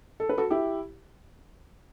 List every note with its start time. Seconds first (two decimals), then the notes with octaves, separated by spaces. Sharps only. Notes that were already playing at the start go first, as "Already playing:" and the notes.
0.20 A4
0.29 B4
0.38 F#4 A4
0.50 E4 G4